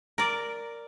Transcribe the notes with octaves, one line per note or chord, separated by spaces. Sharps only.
A#4 D5